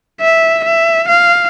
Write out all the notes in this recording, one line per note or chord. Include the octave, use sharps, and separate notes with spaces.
E5
E5
F5